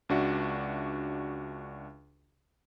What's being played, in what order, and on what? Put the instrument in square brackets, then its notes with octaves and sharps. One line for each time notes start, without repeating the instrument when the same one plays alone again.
[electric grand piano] C#2 D4 F#4 E5